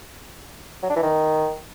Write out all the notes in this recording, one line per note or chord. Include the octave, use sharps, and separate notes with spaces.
F#3
D4
E3
D#3